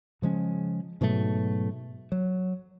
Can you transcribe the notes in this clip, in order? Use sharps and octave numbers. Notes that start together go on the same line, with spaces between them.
C#3 F3 G#3 C#4
G#2 B2 F#3 A3
F#3